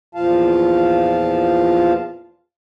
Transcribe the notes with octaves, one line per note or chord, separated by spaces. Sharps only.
E2 A#2 F3 F4 F5 A5